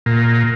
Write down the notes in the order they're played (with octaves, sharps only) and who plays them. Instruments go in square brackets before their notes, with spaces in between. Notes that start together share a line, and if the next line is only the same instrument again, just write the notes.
[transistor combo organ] A#2